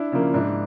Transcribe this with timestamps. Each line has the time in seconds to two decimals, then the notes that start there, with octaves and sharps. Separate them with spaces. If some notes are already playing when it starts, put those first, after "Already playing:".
Already playing: D4 E4
0.12 C#3 F3 A#3
0.33 G#2 D4 E4